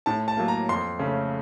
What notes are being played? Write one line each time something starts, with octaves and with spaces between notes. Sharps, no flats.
A2 A5
A5
F#3 A#3
A#5
F2 C6
C#3 A3 C#4